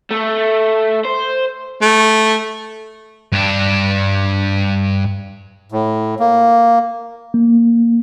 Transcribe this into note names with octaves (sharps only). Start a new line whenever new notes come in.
A3
C5
A3
G2 D4
A2
A#3
A#3